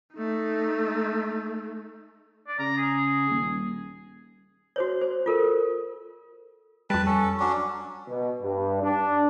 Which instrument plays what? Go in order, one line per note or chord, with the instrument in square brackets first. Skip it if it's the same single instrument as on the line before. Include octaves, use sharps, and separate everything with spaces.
[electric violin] A3 D#4
[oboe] D5
[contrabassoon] C#3 [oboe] A#5
[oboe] G#4
[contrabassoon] D#1
[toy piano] F#4 C5 C#5
C5
F4 A4 A#4
[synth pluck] F2 G3 [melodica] B4 A5
[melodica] C#4 A4
F#3 C#4 D4
[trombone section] B2
G2
D4